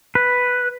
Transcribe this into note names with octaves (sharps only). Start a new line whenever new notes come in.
B4